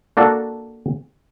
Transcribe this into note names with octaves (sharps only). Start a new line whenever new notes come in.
A#3 D4 F#4 A4